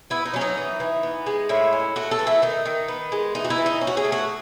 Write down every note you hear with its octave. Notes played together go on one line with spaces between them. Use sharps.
B3 E4
D#4
F#3 C#4
D#4
E3
E3
B3
G#3
A2 E4
C#4
A3 F#4
A4
E3
E4
D#3 D#4
D#3
B3
G#3
E3 D#4
F#4
E4
E3
D#4
C#4
F#4
G#4
A3
F#4